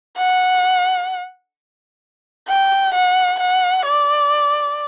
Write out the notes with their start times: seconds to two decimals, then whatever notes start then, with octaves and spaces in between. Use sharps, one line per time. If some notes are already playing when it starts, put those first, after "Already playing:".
0.18 F#5
2.48 G5
2.94 F#5
3.40 F#5
3.86 D5